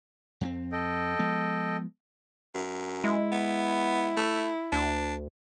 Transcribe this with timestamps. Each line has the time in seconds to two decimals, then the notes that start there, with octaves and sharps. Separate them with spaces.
0.41 F2 A#3 C4
0.72 A4 D#5 G5
1.19 F3 G#3 B3
2.55 F#2
3.04 G#3 E4
3.32 B3
4.17 A3
4.72 D2 D4